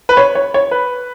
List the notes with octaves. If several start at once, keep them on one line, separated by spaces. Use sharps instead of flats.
B4
C#5
C#5
C#5
B4